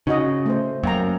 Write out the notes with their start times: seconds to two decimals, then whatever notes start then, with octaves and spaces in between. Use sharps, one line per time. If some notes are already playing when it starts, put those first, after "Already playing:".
0.07 C#3 D#4 F#4 D#5
0.46 A3 C5
0.83 F#2 A#3 G5 A#5